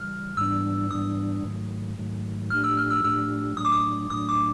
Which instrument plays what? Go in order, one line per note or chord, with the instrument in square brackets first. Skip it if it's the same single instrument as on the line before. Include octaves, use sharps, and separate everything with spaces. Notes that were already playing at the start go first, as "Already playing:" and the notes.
Already playing: [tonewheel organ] C#3 E3 G3 [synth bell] F6
[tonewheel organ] G#2 E3 G3 B3 D4 [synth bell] E6
[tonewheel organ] G#2 E3 G3 B3 D4 [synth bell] D#6
[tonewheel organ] G#2 D#3 F#3 A3
G#2 D#3 F#3 A3
[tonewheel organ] A2 F3 A3 D4 G4 [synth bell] F6
[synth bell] E6
F6
E6
[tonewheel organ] A2 F3 A3 D4 G4 [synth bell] E6
[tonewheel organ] A2 F#3 A3 D4 [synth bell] D#6
[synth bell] D6
D#6
[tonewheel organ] A2 F#3 A3 D4 [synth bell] D#6
[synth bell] D6